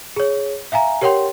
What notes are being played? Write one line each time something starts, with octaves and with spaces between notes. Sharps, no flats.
G#4 C#5
E5 F5 G#5 A#5
G4 A#4 C#5 F#5 G5 C6